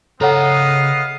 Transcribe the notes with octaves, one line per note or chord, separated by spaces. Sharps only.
C#3 B3 A4 C#5 D#5 F5 F#5 A#5